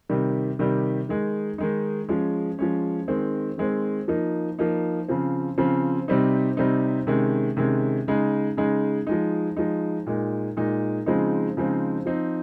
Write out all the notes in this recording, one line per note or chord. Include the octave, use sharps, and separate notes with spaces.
C3 D#3 G3
C3 D#3 G3
D#3 G#3 D#4
D#3 G#3 D#4
F3 G#3 C#4
F3 G#3 C#4
D#3 G#3 C4
D#3 G#3 C4
F3 A#3 D#4
F3 A#3 D#4
C#3 F3 C4
C#3 F3 C4
C3 G3 C4 D#4
C3 G3 C4 D#4
C3 D#3 G#3 C#4
C3 D#3 G#3 C#4
C#3 G#3 D#4
C#3 G#3 D#4
F3 G#3 D#4
F3 G#3 D#4
A#2 G#3 D#4
A#2 G#3 D#4
C#3 F3 G#3 C4 D#4
C#3 F3 G#3 C4 D#4
F3 C4 D#4